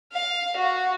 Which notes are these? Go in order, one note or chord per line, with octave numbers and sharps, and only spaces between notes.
F5
F#4